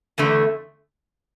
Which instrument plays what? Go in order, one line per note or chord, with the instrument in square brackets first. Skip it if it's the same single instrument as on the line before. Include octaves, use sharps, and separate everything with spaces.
[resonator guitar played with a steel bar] E2 D3 A3